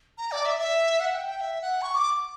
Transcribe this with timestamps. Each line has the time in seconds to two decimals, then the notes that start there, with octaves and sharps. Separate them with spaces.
0.18 A#5
0.32 D5
0.45 E5
0.59 E5
1.00 F#5
1.13 G5
1.27 G5
1.41 E5
1.62 F#5
1.82 C#6
1.95 D6